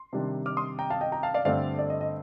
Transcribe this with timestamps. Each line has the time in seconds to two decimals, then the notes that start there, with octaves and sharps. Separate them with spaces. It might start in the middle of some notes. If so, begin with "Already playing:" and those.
Already playing: C6
0.13 C3 D#3 G3 D4
0.46 D6 F6
0.57 C6 D#6
0.79 G5 A#5
0.90 F5 A5
1.01 D#5 G5
1.12 G5 A#5
1.23 F5 A5
1.34 D5 F5
1.45 G2 D3 A3 C4 D5 F5
1.79 D5
1.90 D#5
2.01 D#5